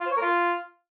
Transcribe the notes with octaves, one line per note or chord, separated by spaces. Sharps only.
F4
C5
C#5
A#4
F4